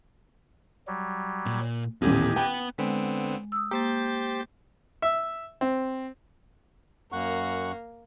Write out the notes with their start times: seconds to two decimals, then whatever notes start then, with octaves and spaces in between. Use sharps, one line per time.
0.87 F#3 G3
1.46 A#2
2.02 D#1 A1 B3 E4 G4 D#5 G#5
2.36 B3 G5 B5
2.78 D3 G#3 B3 C4
3.52 D#6 E6
3.71 A#3 G4 C5 A6
5.02 E5
5.61 C4
7.12 F#2 A#3 F#5 C#6